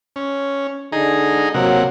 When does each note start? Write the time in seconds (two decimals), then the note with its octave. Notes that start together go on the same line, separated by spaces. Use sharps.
0.16 C#4
0.92 D3 D#4 G#4 A#5
1.54 C3 F#3 A#3 F#5